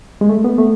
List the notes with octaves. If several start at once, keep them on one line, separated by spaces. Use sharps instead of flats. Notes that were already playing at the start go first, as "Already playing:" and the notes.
G#3
A3
B3
A3